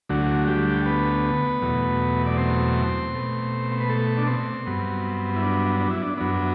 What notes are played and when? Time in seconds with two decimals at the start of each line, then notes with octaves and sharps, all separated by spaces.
0.09 D2 D3 F#3 A3 F#4
0.47 G3 G4
0.86 B3 B4
1.62 E2 B2 F#3 A3
2.26 D5
2.37 C4 C5
3.14 B2 A3
3.72 C5
3.80 B4
3.89 A3 A4
4.17 D4
4.27 C4
4.66 G2 F#3 B3
5.36 E4
5.42 D4
5.80 D4
5.91 E4
6.02 D4
6.17 F#2 F#3 B3 D4